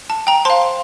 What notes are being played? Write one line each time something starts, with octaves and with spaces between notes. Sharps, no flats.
A5
G5 A#5
C5 F5 A5 C6